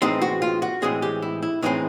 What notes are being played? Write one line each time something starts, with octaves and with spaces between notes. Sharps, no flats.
A2 E3 G#3 C4 D#4
F#4
F4
F#4
A2 E3 G#3 C4 G#4
G4
E4
E4
A2 E3 G#3 C4 D#4